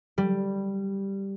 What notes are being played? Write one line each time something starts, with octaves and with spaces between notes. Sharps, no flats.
G3